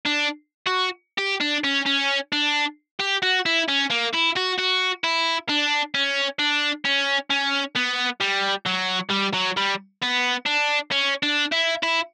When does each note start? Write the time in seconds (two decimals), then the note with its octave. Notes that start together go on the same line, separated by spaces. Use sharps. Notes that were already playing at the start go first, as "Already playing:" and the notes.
0.06 D4
0.67 F#4
1.18 G4
1.41 D4
1.64 C#4
1.86 C#4
2.33 D4
3.00 G4
3.23 F#4
3.46 E4
3.68 C#4
3.90 A#3
4.14 E4
4.36 F#4
4.58 F#4
5.04 E4
5.49 D4
5.95 C#4
6.39 D4
6.85 C#4
7.30 C#4
7.76 B3
8.21 G3
8.66 F#3
9.11 G3
9.34 F#3
9.57 G3
10.02 B3
10.46 D4
10.92 C#4
11.23 D4
11.52 E4
11.83 E4